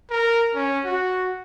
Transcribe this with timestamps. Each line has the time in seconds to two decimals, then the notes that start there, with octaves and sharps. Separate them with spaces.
0.10 A#4
0.55 C#4
0.85 F#4